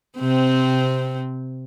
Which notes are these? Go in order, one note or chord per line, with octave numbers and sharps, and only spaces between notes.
C3 C4